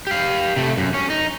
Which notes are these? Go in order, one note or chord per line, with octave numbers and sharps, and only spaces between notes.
G4 F5
C3 A3
F#2
C#4
D#4